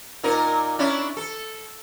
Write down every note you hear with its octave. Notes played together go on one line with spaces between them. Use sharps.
A#2 D#4 A#4
C#4 D4 E4
A4